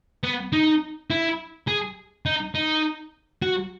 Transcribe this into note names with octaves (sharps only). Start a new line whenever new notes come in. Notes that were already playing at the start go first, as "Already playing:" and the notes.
B3
D#4
E4
G#4
D#4
D#4
F#4